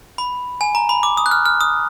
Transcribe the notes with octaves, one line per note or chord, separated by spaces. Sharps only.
B5
G#5
A#5
B5
D6
D#6
F#6
F6
F6
D#6